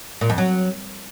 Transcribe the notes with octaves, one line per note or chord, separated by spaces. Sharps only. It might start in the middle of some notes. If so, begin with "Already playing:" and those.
A#2
F2
F#3